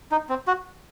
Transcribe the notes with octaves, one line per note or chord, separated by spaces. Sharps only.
D#4
C4
F#4